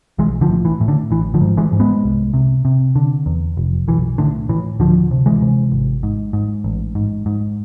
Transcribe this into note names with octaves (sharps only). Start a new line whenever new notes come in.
B1 E3 G#3
D3 F3
A2
E3
A2
D3
A1 E3
D3 F3
G#2
E3 G#3
G#2
G#3 B3
C2
C3
C3
D3
E2
F1
B1 E3
A2 D3
A2 E3
D2 D3 F3
C3
E3 G#3
C3
G#1
G#2
G#2
A1
G#2
G#2